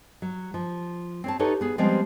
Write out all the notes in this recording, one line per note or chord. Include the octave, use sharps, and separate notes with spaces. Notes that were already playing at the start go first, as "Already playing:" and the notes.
F#3
F3
C4 C#5 A5
D#4 G4 A4 B4 C#5
B3 G#4
F3 G3 G#3 B3 C4